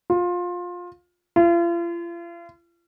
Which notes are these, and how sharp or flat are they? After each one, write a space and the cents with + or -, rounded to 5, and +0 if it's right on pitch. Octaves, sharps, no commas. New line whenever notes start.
F4 +20
F4 -40